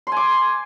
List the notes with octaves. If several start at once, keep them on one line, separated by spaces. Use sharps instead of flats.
G#5 C6 D6